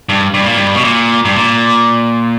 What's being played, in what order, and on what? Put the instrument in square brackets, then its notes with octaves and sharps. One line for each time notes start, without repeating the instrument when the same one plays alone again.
[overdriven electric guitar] G2
G2
A#2
G2
B2
A#2
G2
A#2